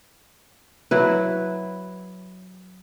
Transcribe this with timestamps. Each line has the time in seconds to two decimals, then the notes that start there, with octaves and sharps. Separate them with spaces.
0.91 F#3 E4 B4